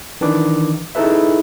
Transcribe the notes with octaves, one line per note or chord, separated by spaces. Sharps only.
D#3 E3 D4 B4 D6
D#4 E4 G#4 A4 B4 E5